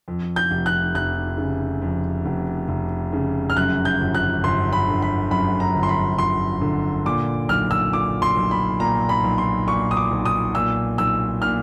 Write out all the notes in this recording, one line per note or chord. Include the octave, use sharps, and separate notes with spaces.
F2
G6
F1
F#6
F1 F#6
C#3
F2
F1
F1
C#3
F6
F#2 F#6
G6
G1
F#6
G1 C6
B5
D3
B5
F#2 B5
A#5
G1
C6
B5
G1 C6
D3
A#2 D6
B1 F6
E6
A#2 D6
C6
B1
B5
A#2 A#5
B5
B1
C6
A#2 C#6
D#6
D6
B1
D#6
A#2 E6
B1 E6
A#2 F6